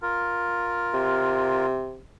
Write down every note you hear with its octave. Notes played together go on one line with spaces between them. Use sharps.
F4 A#4
C3